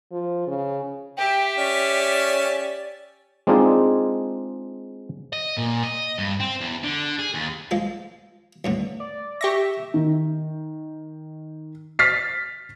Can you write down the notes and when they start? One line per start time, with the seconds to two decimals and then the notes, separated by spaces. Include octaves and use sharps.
0.12 F3
0.47 C#3
1.17 G4 E5 G5
1.58 C#4 D5
3.47 G#3 C4 D4 D#4 F4 G#4
5.33 D#5
5.57 A#2
5.83 D#5
6.19 G2
6.40 C4
6.61 E2
6.83 D3
7.19 G#4
7.34 D#2
7.71 F3 G#3 A4
8.65 E2 A2 D3
9.00 D5
9.41 G4 E5 C#6 A#6
9.94 D#3
11.99 F6 A6 B6 C7